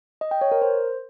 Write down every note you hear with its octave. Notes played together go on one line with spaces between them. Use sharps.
D#5
G5
C#5
A#4
C5